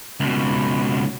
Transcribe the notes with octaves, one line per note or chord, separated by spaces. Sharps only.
C#2 B2